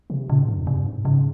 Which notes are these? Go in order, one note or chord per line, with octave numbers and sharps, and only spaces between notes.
C3
A#2 C#3
G#2
G2
F2
G2 C3
G#2
G#2 C#3